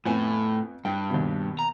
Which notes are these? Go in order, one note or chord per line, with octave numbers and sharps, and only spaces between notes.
F2 A2 B3 G#5
G2 G5
D#2 B2
A#5